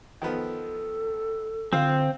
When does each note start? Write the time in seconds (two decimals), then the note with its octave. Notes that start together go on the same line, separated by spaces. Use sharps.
0.22 D#3 F3 B3 A4
1.73 D3 C4 F4 C5 F5